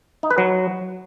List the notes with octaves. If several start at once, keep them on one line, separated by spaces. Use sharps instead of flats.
D#4
B4
F#3